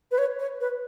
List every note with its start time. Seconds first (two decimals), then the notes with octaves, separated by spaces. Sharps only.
0.11 B4
0.18 C#5
0.39 C#5
0.61 B4